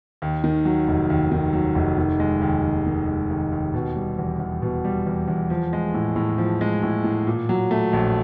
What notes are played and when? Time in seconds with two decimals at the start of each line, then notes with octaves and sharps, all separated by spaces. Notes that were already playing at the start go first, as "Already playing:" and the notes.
0.22 D#2
0.44 D#3
0.65 F#3
0.88 F1
1.10 D#2
1.32 D#3
1.53 F#3
1.75 F1
1.98 D#3
2.20 G#3
2.42 D#2
2.63 D#2
2.86 D#3
3.08 G#3
3.30 D#2
3.52 D#2
3.74 B2
3.96 G3
4.19 E2
4.39 E2
4.62 B2
4.85 G3
5.06 E2
5.28 E2
5.50 F3
5.73 G#3
5.94 A2
6.16 A2
6.38 F3
6.61 G#3
6.83 A2
7.04 A2
7.27 A#2
7.49 F#3
7.71 A3
7.93 A#1